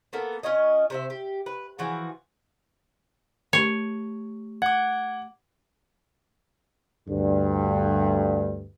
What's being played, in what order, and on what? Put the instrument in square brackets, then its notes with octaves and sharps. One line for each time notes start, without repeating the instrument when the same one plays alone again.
[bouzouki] A#3 B3 A4
C#4 F4 C#5 D#5
C3 C5 E5
G4
B4
E3 F3 F#4 G#4
[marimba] A3 G4 [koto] C#5
[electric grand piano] F#5 [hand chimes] D6 G#6
[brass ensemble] D2 G2